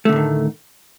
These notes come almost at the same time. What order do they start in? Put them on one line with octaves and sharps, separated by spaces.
A3 D3 A2 D#3